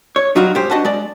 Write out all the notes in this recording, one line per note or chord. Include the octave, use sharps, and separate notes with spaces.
C#5
F#3 G3 D#4 F4 F#4
G#2 G4 C5
D4 F#4 B4 D#5 F#5 A5
G#3 D5